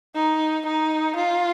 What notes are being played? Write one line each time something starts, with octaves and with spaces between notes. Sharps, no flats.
D#4
D#4
F4